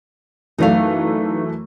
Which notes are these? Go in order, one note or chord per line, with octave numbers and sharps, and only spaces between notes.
F#2 E3 A3 D#4 D5 F5